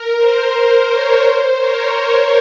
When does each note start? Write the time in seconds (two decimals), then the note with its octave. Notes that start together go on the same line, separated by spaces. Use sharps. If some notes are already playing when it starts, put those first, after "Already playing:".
Already playing: A#4
0.17 C5
0.53 C5
0.87 A#4 C#5
1.23 C5
1.58 A#4 C#5